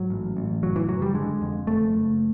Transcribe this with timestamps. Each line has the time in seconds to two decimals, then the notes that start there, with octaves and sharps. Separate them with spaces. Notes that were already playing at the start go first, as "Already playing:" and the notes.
Already playing: G#2 F#3
0.10 A1
0.37 A1
0.62 F#1 F#3
0.76 E3
0.89 F#1 F#3
1.02 G3
1.14 D3 G#3
1.41 F2
1.67 F#1 A3
1.93 F#1